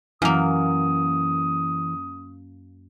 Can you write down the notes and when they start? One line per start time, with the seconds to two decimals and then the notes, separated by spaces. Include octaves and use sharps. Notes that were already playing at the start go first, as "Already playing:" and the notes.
0.22 F#2 E3 A#3 D#6